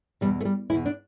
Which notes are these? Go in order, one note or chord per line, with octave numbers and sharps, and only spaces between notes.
E2 B2 G3
A3
G3
E2 B2 E4
D4